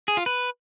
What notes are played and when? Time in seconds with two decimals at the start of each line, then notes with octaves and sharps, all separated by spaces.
0.08 G#4
0.17 F4
0.26 B4